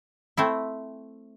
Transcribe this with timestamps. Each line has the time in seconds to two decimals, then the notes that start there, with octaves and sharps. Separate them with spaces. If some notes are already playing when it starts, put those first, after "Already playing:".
0.37 A3 C4 E4